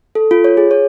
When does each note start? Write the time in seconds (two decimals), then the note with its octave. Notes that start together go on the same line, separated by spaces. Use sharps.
0.15 A4
0.31 F4
0.44 C#5
0.57 G#4
0.71 C#5